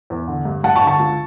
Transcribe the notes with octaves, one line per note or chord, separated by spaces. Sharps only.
E2
D3
G2
G2 F#5 A5
A5 C#6
D3
A5 C#6
C#2